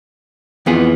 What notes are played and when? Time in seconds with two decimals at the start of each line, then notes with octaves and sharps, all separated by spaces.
0.66 F2 E3 B3 F4 G#4